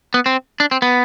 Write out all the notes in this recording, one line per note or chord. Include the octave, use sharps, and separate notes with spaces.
B3
C4
D4
C4
B3